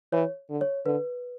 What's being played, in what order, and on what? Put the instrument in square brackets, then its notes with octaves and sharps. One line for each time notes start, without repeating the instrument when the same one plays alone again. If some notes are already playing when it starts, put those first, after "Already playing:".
[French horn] E3 [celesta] C#5
[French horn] D3
[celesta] C#5
[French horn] D3 [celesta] B4